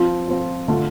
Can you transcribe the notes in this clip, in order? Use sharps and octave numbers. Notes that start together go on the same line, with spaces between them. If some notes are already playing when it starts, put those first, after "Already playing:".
Already playing: F3 C4 F4
F3 C4 F4
D3 A3 F4